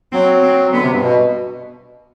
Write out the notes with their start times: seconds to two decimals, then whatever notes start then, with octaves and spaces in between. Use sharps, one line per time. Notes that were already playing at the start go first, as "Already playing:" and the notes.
0.12 F#3 C4
0.43 C4
0.72 D3 B3
0.82 C3
0.93 G2
1.02 B2